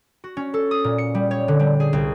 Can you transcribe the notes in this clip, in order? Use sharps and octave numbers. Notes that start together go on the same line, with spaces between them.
F#4
C#4
A4
D#6
A#2
C#7
G3
C#5
D3
G3
G#4
C2